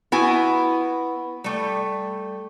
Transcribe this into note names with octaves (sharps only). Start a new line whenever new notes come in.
B3 E4 F#4 G#5
G3 A3